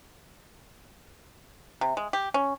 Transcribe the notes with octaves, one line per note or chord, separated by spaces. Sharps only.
C3
G#3
G4
C#4